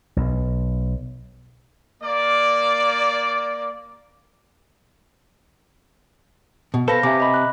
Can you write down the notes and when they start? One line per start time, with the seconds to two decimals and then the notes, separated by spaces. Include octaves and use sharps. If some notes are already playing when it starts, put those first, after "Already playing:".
0.17 B1
2.02 A#3 D5
6.74 B2
6.88 A4 B4 C5 F5 A5 A#6
7.03 C3 E5 G#5 D6
7.20 D#5 B5
7.34 F#6